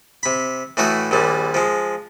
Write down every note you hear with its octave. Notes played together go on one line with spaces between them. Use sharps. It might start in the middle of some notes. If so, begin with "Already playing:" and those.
C3 B5
A2 E3 A3 F#4 D#6
A#1 D#2 A#2 G3
F3 G#3